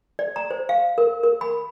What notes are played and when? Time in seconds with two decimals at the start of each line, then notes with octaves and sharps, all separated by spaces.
0.19 D5
0.36 A#5
0.51 C5
0.69 F5
0.98 A#4
1.23 A#4
1.41 B5